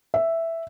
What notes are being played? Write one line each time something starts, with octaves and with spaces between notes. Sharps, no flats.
E5